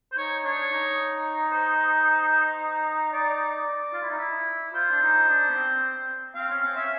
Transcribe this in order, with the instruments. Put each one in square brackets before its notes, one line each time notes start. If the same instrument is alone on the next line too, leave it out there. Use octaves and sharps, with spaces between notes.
[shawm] C5
[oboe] D#4 [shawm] C#5
[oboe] D4 [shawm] C#5
[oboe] D#4
[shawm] C5
D5
[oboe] F4
E4
D#4
E4
[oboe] F4 [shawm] C5
[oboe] D4
D#4
D4
B3
C4
[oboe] C4 [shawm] F5
[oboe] C#4
C4
[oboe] C#4 [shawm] E5